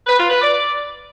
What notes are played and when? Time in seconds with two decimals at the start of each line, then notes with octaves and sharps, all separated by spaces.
0.07 B4
0.19 F4
0.30 B4
0.42 D5